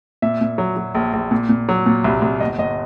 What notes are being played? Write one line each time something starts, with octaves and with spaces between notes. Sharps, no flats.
A#2 E5
A#2
F#3
F#3
A#1
A#1
A#2
A#2
F#3
A#2
C2
C2
G1 D#5
G1 D#5